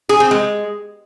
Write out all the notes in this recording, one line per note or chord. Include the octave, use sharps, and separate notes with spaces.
G#4
C4
G#3